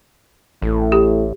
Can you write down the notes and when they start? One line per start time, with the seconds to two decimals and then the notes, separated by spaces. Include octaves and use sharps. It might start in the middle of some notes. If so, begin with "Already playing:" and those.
0.62 A1 A2
0.92 G4